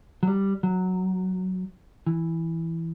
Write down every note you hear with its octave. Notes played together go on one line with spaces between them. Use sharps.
F#3
G3
F#3
E3